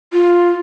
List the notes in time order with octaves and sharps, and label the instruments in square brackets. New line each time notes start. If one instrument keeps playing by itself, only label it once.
[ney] F4